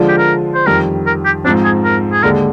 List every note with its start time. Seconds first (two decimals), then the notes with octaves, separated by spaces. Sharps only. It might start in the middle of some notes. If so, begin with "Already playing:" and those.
Already playing: D3 F3 G#3 D4 F4
0.08 G4
0.18 A#4
0.54 C5
0.66 F2 D#3 G3 A#4
1.06 A#4
1.25 G4
1.45 G#2 F3 C4 D4
1.64 G#4
1.84 A#4
2.12 G#4
2.23 D#2 D3 G#3 A#4